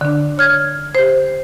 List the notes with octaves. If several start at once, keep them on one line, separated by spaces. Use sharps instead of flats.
D3 D4
C#5 F6 G#6
G4 C5